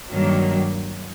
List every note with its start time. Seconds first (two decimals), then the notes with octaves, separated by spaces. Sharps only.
0.10 G2 D#3 F#3 A#3